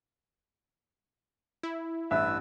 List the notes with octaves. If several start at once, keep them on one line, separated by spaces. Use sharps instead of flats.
E4
A1 G2 B4 E5 E6